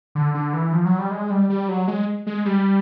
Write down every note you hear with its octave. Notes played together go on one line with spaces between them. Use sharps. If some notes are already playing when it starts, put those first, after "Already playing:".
D3
D3
E3
F3
F#3
G3
G#3
G3
G3
F#3
G#3
G#3
G3